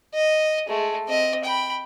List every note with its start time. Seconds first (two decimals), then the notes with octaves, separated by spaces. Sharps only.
0.14 D#5
0.68 G#3 A3
1.07 C4 D#5
1.44 G5 B5